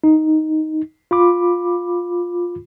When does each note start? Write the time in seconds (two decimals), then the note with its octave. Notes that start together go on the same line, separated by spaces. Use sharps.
0.04 D#4
1.11 F4 B5 D6